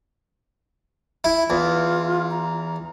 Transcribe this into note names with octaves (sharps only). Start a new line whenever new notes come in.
E4
E2 F4
A#5